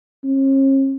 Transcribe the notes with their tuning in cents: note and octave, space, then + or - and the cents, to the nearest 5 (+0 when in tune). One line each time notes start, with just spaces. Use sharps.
C#4 -45